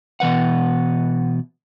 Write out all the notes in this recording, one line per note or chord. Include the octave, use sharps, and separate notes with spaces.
B2 E3 B4 F#5